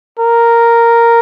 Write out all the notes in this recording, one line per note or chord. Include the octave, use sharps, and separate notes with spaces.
A#4